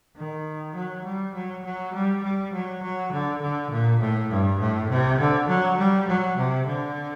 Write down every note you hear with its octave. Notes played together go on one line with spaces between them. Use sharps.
D#3
F#3
G3
F#3
F#3
G3
G3
F#3
F#3
D3
D3
A#2
A2
G2
A2
C3
D3
F#3
G3
F#3
C3
D3